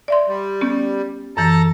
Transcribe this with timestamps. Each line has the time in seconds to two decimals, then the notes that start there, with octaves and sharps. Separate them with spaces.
0.08 D5 E5 C6
0.28 G3
0.61 B3 C#4 G4
1.37 F#2 E3 A4 A5 A#5